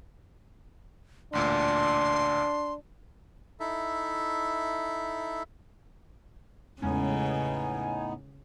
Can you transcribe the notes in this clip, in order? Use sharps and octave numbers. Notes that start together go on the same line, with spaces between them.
A1 D2 A#2 D4 C6
D#4 E4 A4 E5
E2 A2 C#3 G#3 B3 C#4 D#4 G#5